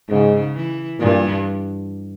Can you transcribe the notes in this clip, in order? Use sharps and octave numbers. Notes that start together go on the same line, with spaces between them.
G#2 C#3
E3
G2 A#2